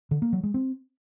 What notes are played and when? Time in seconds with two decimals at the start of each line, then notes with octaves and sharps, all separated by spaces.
0.11 D3
0.22 A#3
0.33 F#3
0.43 G#3
0.54 C4